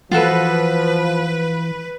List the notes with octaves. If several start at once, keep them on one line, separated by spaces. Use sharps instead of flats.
E3 F3 F4 F#4 A4 B4